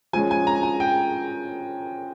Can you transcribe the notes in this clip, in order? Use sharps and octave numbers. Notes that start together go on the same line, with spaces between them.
F3 G#3 C#4 G#5
G#5
A#5
G#5
G5